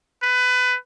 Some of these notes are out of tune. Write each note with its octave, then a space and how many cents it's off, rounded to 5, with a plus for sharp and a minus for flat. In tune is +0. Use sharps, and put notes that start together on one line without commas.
B4 +20